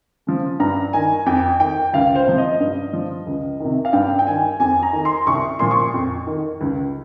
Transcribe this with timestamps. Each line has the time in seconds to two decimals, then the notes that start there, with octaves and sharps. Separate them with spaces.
0.27 C#3 F3
0.60 G2 A#5
0.93 D#3 G#5
1.26 F2 G5
1.60 D#3 G5
1.94 C#2 F5
2.15 C5
2.27 C3 F3
2.38 D#5
2.60 G2
2.93 F3
3.27 C#2
3.60 C3 D#3
3.85 F5
3.93 G2 G5
4.19 G5
4.27 D#3 G#5
4.60 F2 G#5
4.83 A#5
4.93 D#3
5.05 C6
5.27 C2 C#6
5.59 A#2 F3 C6
5.71 C#6
5.94 F2
6.27 D#3
6.61 C#2